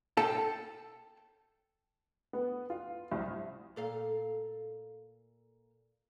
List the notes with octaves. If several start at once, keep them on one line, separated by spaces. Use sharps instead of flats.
A4 G5 A5
B3
F4
C2
A#2 A4 F5